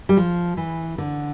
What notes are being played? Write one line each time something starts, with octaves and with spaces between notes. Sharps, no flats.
G3
F3
E3
D3